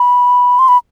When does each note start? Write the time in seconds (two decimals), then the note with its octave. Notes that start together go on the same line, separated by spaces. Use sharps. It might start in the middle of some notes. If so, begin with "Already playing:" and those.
Already playing: B5
0.59 C6
0.68 B5